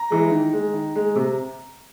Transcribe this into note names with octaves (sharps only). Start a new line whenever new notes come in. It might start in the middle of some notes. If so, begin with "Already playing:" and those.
Already playing: A#5
E3 G#3
D#3
G#3
D#3
G#3
C3